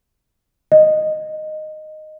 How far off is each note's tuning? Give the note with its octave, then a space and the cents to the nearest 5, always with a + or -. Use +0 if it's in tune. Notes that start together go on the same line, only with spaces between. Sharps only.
D#5 -10